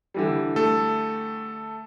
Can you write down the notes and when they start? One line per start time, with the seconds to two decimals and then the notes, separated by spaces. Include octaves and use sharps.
0.14 D3 E3 G3
0.56 A3 A4